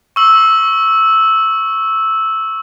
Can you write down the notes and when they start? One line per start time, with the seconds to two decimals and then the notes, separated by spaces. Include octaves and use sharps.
0.16 C#6 E6 F#7